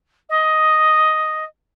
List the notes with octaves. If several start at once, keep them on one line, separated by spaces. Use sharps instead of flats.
D#5